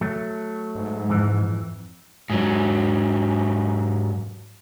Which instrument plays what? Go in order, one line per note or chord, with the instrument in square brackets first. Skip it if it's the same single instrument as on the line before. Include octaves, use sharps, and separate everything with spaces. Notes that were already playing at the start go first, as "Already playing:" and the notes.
[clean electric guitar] F#3 A3
[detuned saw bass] G#2
[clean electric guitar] F2 E3
[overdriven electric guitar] G#2 F#3